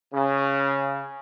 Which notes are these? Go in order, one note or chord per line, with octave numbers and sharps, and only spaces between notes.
C#3